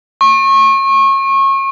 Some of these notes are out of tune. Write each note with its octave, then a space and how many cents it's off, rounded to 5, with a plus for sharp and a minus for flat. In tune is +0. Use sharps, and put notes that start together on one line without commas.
C#6 -30